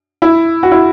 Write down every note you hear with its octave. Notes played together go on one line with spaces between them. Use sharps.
E4
F#4
E4